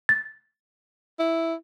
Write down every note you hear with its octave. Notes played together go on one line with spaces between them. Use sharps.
A6
E4